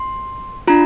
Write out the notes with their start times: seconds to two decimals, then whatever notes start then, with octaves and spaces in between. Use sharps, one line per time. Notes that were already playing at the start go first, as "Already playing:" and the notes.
Already playing: C6
0.68 D4 F4 A#5